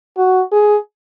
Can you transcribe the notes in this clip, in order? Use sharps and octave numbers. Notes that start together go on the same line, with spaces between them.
F#4
G#4